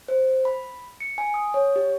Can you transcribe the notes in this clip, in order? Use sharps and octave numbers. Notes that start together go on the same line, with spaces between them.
C5
B5
C#7
G#5
D#6
C#5
G4